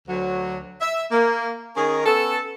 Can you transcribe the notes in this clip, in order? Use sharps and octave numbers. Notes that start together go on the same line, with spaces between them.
D2 F#3
E5
A#3
D#3 C#4 D#4 G#4 A#4
B3 C#4 A4